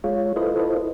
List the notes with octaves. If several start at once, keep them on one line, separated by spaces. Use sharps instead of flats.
G#3 F4 C#5
E4 F4 A4 B4 C5 D#5